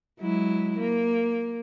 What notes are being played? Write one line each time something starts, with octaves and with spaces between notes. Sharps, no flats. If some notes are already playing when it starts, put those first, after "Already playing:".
F#3 G#3 E4
A#3